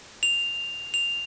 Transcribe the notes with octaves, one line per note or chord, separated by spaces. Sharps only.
F7
F7